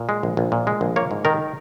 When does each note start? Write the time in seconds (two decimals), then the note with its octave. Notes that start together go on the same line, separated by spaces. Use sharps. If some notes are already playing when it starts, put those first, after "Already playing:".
Already playing: A#2
0.09 G#3
0.23 A#1
0.37 A#1
0.52 A#2
0.67 G#3
0.81 A#1
0.96 A#3 C#5
1.11 G#2
1.25 D#3 A#4